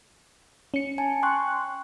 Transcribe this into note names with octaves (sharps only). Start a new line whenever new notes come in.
C#4 C#7
G#5 A5
G5 C6 C#6 F#6